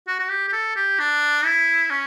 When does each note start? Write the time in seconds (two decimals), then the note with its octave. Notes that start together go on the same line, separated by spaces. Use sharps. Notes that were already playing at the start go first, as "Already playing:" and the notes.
0.07 F#4
0.19 F#4
0.30 G4
0.49 G4
0.53 A4
0.76 G4
1.00 D4
1.45 E4
1.90 C#4